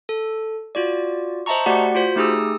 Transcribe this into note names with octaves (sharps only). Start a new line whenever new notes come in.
A4
F4 F#4 D5
C5 D#5 E5 A5 A#5 C#6
A3 F#4 G4 D5 F#5
F4 F#4 C5
A3 D#4 G4 G#4 D#6 E6